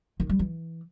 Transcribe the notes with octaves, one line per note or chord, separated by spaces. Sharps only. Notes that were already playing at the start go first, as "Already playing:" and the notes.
D#3
G3
E3